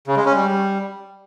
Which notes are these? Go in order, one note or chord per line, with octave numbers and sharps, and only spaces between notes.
C#3
G#3
C#4
G3